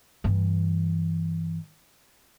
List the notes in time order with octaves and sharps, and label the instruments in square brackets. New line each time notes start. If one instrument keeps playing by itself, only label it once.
[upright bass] G2 E3